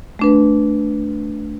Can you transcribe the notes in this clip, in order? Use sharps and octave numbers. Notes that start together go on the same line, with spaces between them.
A3 D4 B4